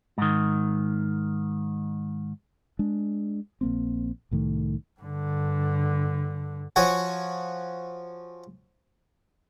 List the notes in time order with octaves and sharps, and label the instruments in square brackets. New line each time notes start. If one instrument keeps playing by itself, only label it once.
[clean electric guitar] G#2 D#3
[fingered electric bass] G#3 D4
A#1 A#3 C4
C2 A2 D#3 A3
[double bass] G2 D3
[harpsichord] F3 F#4 C#5 F#5 G#5